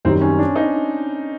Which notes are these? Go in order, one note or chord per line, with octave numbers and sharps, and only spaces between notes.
F#2 D#3 G3 C4
C#4
D4
D#4